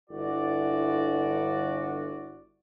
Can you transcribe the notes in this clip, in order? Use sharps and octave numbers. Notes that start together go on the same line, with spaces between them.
G1 E4 F#4 D5